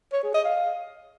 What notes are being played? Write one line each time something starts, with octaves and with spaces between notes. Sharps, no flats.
C#5
G#4
D#5
F5